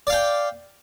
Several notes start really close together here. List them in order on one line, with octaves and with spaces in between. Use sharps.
D5 F5 G5